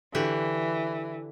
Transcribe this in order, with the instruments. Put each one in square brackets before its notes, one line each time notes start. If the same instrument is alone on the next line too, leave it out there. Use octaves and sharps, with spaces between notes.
[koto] D3 F#4 G4 [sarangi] E3